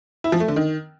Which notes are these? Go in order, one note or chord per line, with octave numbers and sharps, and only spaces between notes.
E4
F3
A3
D3
D#3